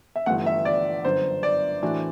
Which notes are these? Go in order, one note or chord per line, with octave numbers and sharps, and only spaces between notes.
E5
G1 G2 E3 A3 F#5
E5
D5
G1 F#2 D3 C5
D5
A2 E3 A3 D4 F#4